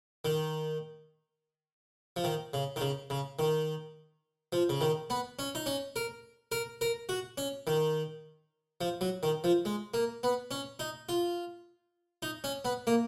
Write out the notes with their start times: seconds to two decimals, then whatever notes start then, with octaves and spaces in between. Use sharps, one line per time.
0.25 D#3
2.16 F3
2.24 D#3
2.54 C#3
2.76 D#3
2.81 C#3
3.10 C#3
3.39 D#3
4.52 F3
4.69 C#3
4.81 D#3
5.10 B3
5.39 C#4
5.55 D#4
5.66 C#4
5.96 A#4
6.52 A#4
6.81 A#4
7.09 F#4
7.38 C#4
7.67 D#3
8.81 F3
9.01 F#3
9.23 D#3
9.44 F3
9.65 G#3
9.94 A#3
10.23 B3
10.51 C#4
10.79 D#4
11.09 F4
12.22 D#4
12.44 C#4
12.65 B3
12.87 A#3